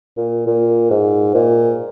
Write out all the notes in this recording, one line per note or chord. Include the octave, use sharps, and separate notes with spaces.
A#2
A#2
G#2
A#2